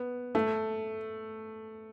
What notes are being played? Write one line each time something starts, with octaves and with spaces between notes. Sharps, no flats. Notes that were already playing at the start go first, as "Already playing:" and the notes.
Already playing: B3
A3